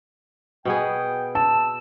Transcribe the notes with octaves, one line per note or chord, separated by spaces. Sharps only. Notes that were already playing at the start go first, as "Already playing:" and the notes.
B2 B3 G#4 G5
A5 E6